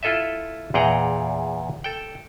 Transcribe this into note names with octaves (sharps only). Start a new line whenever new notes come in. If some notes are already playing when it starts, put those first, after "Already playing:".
E4 F4 A4 D#5 E5
E2 A#2 G#4 F#5 G5 A#5
A4 G5